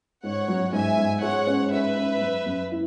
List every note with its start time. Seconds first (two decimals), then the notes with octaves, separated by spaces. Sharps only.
0.24 G#2 C#5 F#5
0.48 F#3
0.72 G#2 E5 G#5
0.97 G#2
1.22 G#3 C#5 F#5
1.47 C#4
1.71 C#4 B4 E5
1.96 C#4
2.21 F#2
2.46 F#2
2.71 E4